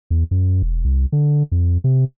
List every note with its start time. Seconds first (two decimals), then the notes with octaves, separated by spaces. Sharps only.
0.11 E2
0.31 F#2
0.62 E1
0.84 C2
1.12 D3
1.52 F2
1.84 C3